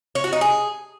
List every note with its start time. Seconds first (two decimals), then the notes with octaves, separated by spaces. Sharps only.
0.15 C#5
0.24 F#4
0.33 D#4
0.41 G#4